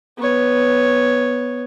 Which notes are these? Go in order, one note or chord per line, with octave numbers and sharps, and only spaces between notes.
B3 C#5